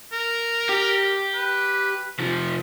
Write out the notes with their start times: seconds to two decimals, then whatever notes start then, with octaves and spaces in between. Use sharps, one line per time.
0.12 A#4
0.69 G4
1.34 B4
2.19 C3 F3